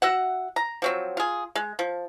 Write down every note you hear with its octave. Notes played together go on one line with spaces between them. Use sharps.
F#4 E5 F#5
A#5
F3 F#3 C4
F4 G#4
G#3
F3